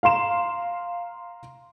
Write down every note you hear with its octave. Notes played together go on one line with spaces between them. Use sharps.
F5 A#5 C6 E7